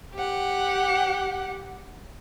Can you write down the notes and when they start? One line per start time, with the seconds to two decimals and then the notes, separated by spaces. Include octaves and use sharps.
0.14 G4 F#5